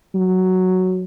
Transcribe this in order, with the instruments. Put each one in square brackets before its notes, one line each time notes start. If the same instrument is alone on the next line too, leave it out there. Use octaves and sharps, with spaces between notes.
[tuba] F#3